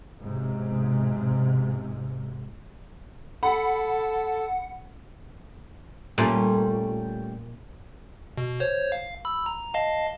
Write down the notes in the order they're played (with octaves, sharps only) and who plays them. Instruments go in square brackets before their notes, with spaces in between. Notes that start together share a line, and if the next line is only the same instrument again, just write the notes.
[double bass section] B1 G#2 C3
[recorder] A4 [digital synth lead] F#5 [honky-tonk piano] B5
[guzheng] A#2 [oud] G3 A3 C#4
[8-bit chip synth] B2
C5 C#5
F5
B5 E6
A#5
D#5 F5 A5